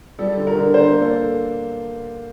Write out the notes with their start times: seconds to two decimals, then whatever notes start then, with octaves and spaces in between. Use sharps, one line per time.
0.19 G3 A4
0.37 D3
0.47 A#4
0.55 D3
0.74 D4 C5
0.93 A#3
1.02 A4